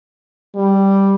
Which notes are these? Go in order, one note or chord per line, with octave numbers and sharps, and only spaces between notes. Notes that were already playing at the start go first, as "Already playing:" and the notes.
G3